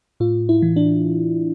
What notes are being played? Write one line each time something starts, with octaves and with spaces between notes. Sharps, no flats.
A2 F4
E4
E3
D4